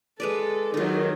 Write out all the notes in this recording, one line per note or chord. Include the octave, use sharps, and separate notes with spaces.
G#3 A4 B4 D5
D#3 F#3 D#4 F4